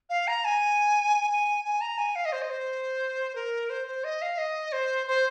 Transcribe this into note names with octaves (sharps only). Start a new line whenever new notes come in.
F5
A#5
G#5
G#5
G#5
A#5
G#5
F5
D#5
C5
D#5
C5
A#4
C5
C5
D#5
F5
D#5
C5
C5